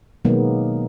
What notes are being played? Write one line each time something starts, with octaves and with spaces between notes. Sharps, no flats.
B2 D#3 F#3 G#3 A#3 B3